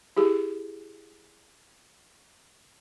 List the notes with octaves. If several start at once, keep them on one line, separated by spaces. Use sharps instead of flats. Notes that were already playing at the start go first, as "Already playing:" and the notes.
E4 G4 G#4